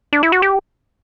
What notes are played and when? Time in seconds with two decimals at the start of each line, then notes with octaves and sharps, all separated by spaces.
0.13 D4
0.23 E4
0.32 F#4
0.42 G4